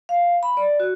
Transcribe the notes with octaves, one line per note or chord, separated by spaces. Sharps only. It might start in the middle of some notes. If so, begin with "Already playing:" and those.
F5
B5
D5
F#4